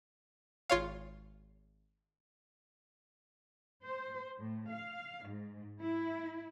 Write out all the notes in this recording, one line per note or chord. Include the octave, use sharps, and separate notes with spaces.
G#1 F4 C#5 F5
C5
A2
F5
G#2
E4